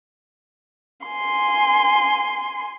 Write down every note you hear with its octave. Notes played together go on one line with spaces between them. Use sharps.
G#5 C6